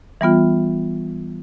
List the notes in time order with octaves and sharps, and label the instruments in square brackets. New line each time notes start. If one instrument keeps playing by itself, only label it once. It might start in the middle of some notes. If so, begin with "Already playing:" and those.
[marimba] E3 G3 B3 F4